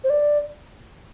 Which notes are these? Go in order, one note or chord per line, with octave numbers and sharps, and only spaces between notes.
C5
D5